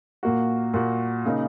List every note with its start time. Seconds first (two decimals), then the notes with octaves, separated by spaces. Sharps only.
0.23 A#2 A#3 F#4
0.74 A#2 A#3 F#4
1.25 C#3 A#3 D#4